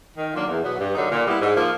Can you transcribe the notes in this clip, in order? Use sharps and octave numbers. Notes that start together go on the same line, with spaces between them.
D#3
F#3 A#3 D4 F4
E2
B2 F#3 B3
G2
D3 F#3 A#3 D#4
A#2
G3 B3 E4
G#2
F3 A#3